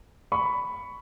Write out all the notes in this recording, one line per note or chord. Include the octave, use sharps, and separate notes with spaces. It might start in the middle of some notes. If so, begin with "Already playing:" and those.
B5 C#6